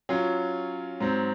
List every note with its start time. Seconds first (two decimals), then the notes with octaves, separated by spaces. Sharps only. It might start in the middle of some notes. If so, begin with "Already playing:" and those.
0.09 F#3 C#4 F4
1.00 G#2 F#3 C4